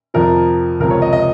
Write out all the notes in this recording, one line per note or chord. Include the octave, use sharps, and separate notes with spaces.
F2 C3 F3 A#4
C#2 C3 F3 A#4
C#5
D#5
D#5